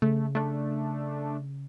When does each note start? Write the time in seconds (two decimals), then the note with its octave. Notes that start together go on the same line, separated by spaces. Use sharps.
0.02 C#3 A3
0.35 A3 D4